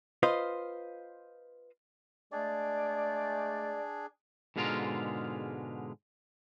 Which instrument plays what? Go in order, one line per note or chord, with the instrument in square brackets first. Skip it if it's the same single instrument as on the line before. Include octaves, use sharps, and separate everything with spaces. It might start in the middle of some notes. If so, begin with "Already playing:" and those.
[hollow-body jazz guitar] F4 B4 C5 D#5 F5
[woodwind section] G#3 A3 D5 [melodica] D4 G#4
[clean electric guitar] G#2 B2 D3 G#3 F4 A#4